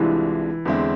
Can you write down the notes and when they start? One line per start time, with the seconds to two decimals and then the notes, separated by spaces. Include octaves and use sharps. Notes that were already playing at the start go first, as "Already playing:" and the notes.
Already playing: C2 C3 E3 G#3 D4 F4
0.65 E2 D3 G#3 C4 E4